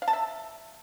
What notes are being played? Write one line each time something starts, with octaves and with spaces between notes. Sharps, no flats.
F5
A5
E5